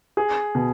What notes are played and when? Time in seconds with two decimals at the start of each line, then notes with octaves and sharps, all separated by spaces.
0.17 G#4
0.55 B2